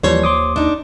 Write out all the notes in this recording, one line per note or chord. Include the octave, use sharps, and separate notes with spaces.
D#2 E3 F3 G3 C5 C#5
C6 D6 D#6
D4 D#4